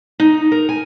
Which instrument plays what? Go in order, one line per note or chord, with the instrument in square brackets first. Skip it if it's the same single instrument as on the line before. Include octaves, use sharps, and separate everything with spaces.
[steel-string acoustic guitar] D#4
A#4
G#5